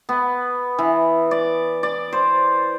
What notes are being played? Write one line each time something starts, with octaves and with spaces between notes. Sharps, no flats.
B3
E3
D5
D5
C5